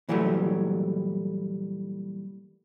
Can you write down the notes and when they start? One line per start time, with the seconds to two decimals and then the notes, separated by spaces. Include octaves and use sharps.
0.09 A#2 E3 F#3 G3 A3